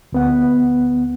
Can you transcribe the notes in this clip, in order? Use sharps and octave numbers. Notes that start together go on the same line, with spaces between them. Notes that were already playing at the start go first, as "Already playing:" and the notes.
D2 B3 F#5